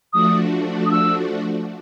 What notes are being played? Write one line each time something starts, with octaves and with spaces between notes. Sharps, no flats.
F3 A3 D4 F#4 D#6
D#6
E6